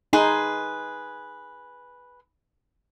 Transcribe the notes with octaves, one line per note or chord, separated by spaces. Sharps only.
D#4 G#4 B4 C6